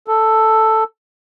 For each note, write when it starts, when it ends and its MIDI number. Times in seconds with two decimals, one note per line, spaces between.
0.08 0.84 69